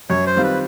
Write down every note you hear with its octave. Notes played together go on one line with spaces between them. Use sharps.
F#2 C#5
C5
D#3 G3 C4 F4
B4